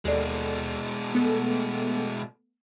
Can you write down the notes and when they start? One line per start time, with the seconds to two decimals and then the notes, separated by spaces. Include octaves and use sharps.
0.05 D#2 B2 G#3 A4 D5
1.14 A3 B3 A4